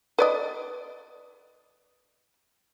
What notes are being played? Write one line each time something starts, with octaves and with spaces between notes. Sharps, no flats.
B4 D5 D#5